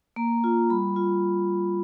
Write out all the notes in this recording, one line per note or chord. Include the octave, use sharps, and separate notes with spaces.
A#3 A#5
F4
G3 B5
F4